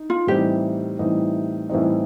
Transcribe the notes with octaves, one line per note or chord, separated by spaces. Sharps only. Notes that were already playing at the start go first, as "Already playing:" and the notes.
Already playing: D#4
F4
A2 E3 G3 C4 D#4 G4
A2 E3 G3 C4 D#4
A2 E3 G3 C4 D#4